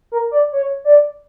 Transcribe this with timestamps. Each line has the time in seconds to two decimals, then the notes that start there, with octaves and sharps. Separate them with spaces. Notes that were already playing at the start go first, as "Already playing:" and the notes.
0.12 A#4
0.31 D5
0.52 C#5
0.85 D5